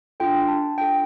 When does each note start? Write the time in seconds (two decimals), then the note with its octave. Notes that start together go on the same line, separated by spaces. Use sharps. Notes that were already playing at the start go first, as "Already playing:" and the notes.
0.20 D4 F4 A4 G5
0.48 A5
0.77 D4 F4 A4 G5